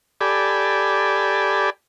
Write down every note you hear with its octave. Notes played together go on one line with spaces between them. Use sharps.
G4 A4 D5 G#5 B5